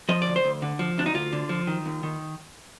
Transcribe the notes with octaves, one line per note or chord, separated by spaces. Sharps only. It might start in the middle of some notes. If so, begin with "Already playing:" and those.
F3 D#5
D2 D5
C5
D2
D3
F3
D2 D4
D#4
D2 F4
D3
F3
D#3
D#2
D#3